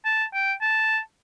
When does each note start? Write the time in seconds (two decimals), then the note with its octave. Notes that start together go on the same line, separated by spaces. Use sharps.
0.05 A5
0.34 G5
0.61 A5